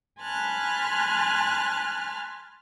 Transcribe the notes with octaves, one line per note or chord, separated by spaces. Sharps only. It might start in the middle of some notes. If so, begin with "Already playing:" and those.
G#5 A5 B5 C6 F6 F#6